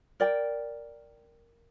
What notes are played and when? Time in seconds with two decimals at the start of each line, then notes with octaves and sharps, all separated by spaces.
0.20 A#4 D5 G5